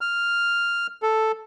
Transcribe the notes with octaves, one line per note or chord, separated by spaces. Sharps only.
F6
A4